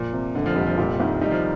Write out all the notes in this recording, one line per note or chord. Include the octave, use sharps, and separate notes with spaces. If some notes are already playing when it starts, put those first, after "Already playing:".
Already playing: A#2 F3
C3
F1 D3
F3
F1 G3
F3
A#2 G3
C2 D#3
G3 D#4
F3